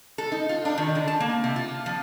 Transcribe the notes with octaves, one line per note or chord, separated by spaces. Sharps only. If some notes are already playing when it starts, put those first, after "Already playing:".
A4
D#4
F4
D4
D#3
D3
A5
A#3
C3
F4
F3